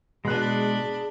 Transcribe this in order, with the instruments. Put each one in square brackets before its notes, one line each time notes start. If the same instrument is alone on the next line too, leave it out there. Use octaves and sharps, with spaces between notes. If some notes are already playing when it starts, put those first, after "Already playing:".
[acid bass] B2 [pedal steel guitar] G#3 F#6 [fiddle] D4 B5 [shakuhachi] G#4